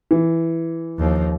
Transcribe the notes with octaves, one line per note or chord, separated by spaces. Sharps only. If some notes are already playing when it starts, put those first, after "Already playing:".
E3
D#2 F3